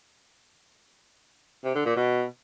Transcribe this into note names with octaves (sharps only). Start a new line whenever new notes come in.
C3
D3
A#2
B2